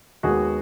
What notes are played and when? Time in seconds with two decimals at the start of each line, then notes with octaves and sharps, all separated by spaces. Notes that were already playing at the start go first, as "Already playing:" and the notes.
0.23 D#2 D#3 G#3 B3 F#4 G#4